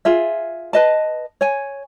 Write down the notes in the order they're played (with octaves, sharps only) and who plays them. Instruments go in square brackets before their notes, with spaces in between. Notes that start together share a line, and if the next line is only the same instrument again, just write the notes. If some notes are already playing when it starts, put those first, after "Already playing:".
[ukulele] F4 G#4 E5
B4 D#5 A5
C#5 G#5